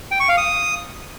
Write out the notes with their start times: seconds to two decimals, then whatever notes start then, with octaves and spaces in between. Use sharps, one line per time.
0.11 G5
0.20 C#6
0.29 F5
0.37 D#6